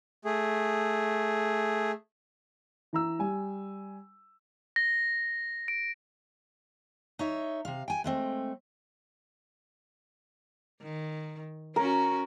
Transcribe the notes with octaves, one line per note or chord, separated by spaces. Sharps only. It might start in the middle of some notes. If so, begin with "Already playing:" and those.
A3 G#4
E3 A#5 E6
G3 G#5
A#6
D7
D#4 C#5 E5
C3 F5
G5 G#5
G#3 A3 C4
D#3
C#4 F#4 A#4